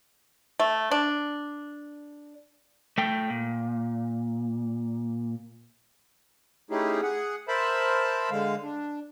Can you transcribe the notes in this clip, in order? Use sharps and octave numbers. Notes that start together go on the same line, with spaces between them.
A3
D4
A3 G5
A#2
A3 C#4 D#4 E4 G4 G#4
G#4 F#5
A#4 C5 E5 A5 B5
D3 G#3 F5
D4